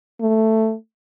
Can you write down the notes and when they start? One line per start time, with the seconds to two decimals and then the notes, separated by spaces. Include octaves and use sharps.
0.21 A3